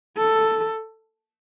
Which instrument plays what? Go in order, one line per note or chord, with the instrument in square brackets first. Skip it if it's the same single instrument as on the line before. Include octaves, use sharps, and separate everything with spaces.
[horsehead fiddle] A4